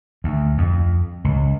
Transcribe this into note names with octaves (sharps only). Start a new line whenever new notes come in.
D2
F2
C#2